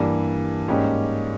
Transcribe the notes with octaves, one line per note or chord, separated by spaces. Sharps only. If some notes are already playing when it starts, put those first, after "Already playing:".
Already playing: G2 E3 G3 A#3
G#2 G3 A#3 C#4 G4